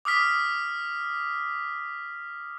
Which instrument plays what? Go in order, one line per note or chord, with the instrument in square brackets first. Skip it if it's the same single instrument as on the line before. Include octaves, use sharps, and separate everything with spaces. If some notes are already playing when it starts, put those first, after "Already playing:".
[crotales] D6 D#6 F6 B6